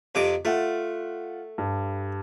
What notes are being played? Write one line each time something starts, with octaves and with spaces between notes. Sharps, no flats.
F2 C3 D6
A3 F4 F#5
G2